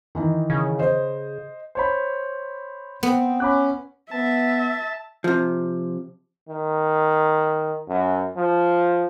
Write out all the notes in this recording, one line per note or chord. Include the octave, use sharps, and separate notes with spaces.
D#3 E3 D#4
C#3
C5 D#5
C5 C#5 B5
B3 C4
C#4 B5 D6 F#6
B3 E5 A5
C3 F3
D#3
F#2
F3